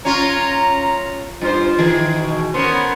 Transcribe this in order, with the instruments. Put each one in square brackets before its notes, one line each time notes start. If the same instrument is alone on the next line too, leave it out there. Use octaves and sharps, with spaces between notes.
[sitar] C#4 F4 [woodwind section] A#5
[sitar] G2 C5 [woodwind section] F4
[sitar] D#3 E3 G#4
[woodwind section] B2
[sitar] B3 C#4 A#4 [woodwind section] C5 B5 C6